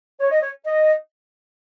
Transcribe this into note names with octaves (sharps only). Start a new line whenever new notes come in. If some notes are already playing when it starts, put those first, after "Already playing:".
C#5
D#5
C#5
D#5